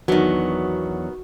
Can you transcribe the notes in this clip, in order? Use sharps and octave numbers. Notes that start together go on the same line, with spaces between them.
E2 D#3 F#3 B3 D4 F#4